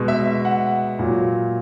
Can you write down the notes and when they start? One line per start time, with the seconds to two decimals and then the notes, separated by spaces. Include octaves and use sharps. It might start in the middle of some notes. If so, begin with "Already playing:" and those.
Already playing: B2 G#3
0.08 E5
0.27 E5
0.45 F#5
0.99 A#2 F#3